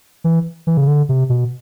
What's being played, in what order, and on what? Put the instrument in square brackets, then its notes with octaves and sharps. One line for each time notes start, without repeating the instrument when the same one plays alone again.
[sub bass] E3
E3
C#3
D3
C3
B2